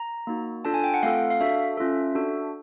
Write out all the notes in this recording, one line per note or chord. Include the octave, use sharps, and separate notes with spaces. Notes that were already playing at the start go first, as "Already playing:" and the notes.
Already playing: A#5
A#3 D#4 F#4
D4 F4 A4 A5
G#5
G5
F#5
A3 C4 F4 A4 F5
F5
D4 F#4 A4 E5
C#4 F4 A4
D4 F#4 A4